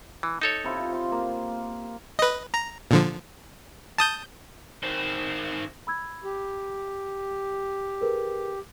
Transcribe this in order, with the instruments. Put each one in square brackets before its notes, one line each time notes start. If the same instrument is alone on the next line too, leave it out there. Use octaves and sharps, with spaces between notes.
[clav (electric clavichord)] E3
D#4 A4 C#5
[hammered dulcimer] C3 E4 F4
F5 C6
A#3
[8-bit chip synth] B4 D#5
A#5
A#2 D3 F3
A5 D#6 G6
[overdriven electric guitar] D#3 C4
[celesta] B5 E6 G#6
[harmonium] G4
[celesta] G#4 A#4 B4